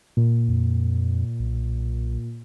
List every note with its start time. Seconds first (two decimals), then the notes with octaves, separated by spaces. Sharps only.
0.17 A#2
0.48 F2
1.40 B1